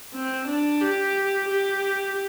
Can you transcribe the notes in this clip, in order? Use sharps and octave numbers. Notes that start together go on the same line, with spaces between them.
C4
D4
G4
G4